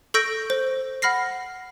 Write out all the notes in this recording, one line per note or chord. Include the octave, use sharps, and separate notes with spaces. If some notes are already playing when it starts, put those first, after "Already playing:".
A4 C#6 E6 G6 A#6 D7
C5
F#5 B5 F6 A#6 C7